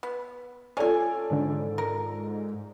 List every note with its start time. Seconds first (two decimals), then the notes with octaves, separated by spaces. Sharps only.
0.03 B3
0.77 C#4 F4 A4 D5 G#5
1.30 G#2 D3 D#3 D4
1.78 A#4